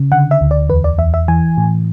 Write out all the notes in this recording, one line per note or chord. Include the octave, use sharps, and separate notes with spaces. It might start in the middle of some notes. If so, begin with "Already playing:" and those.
Already playing: C#3
D3 F#5
E5
D2
D5
E2 B4
D5
E2 E5
E5
E3 G#5
A2